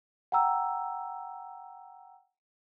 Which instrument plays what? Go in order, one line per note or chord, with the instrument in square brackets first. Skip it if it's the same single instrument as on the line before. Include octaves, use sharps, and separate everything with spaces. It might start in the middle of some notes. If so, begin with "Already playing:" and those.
[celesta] F#5 G5 A#5 E6